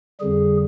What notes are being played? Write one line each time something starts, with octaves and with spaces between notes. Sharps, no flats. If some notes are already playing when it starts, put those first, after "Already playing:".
F2 D3 G3 G#4